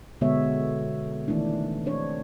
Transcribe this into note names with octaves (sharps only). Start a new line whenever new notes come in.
B2 D3 G#3 B3 C#5 E5
D#3 E3 A3 D4
C4 D4 C#5